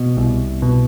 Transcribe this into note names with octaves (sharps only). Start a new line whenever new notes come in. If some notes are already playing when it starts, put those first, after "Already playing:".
Already playing: B2
C2
B2